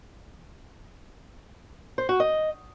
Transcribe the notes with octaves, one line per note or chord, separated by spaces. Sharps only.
C5
F#4
D#5